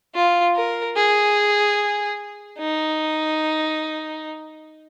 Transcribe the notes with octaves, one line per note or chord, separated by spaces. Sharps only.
F4
A#4
G#4
D#4